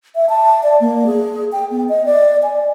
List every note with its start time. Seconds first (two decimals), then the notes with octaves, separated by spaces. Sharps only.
0.15 E5
0.29 A5
0.63 D5
0.80 A#3
1.07 G#4
1.52 G5
1.71 B3
1.89 D#5
2.06 D5
2.43 G#5